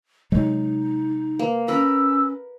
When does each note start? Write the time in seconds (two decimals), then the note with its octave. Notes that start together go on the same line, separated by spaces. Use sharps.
0.32 C3 F#3 G#3 D#4
1.39 A#3 B4
1.68 C#4 A#4 B4 E6